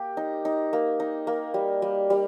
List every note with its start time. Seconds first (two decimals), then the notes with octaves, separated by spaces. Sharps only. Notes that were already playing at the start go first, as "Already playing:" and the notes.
Already playing: A#3 G4
0.17 D#4
0.45 D#4
0.73 A#3
1.00 D#4
1.27 A#3
1.54 G3
1.82 G3
2.10 G3